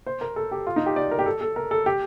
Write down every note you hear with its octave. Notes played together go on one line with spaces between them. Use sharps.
C5
A#4
A4
G4
F4
D#4
G4
D5
A#4
G4
A4
A4
A#4
A4
G4